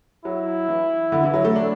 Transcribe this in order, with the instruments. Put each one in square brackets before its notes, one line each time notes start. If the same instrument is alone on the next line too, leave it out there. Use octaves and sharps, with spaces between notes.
[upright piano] F#3 [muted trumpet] E4
[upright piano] E3
D3
E3
F#3
A3
D4